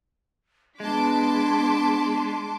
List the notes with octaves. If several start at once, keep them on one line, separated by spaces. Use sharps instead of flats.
G#3 B3 D4 A5 C6 D6 B6